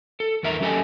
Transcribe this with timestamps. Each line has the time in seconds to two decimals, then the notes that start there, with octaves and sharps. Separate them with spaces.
0.20 A4
0.43 E2 D#3 A#4 E5 G#5 A#5
0.61 F#3 C#4 G4 A4 D#5 G#5